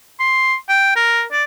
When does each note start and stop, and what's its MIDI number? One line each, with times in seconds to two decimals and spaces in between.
0.20 0.56 84
0.69 0.92 79
0.96 1.23 70
1.32 1.44 74